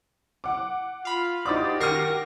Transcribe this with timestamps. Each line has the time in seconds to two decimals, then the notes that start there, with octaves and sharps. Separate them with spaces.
0.44 F#5 D6
1.05 F4 F5 B5
1.46 D#4 F#4 G4 C5 D5 D6 D#6 A6
1.80 D#3 A#4 C#6 F6 A#6 C7 D#7